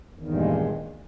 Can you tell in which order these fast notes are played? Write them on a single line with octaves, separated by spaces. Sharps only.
E2 D#3 G2 A#2 G#3